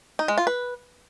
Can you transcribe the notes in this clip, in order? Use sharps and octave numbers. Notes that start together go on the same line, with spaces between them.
D#4
G#3
F4
B4